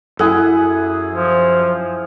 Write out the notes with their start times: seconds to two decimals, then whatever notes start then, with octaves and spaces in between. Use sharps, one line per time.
0.19 F#2 E4 G#4 A4 F#5
1.13 F3